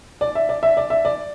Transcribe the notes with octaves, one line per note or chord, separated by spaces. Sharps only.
D5
E5
D5
E5
D5
E5
D5